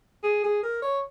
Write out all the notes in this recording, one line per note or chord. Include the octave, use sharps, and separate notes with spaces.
G#4
G#4
A#4
C#5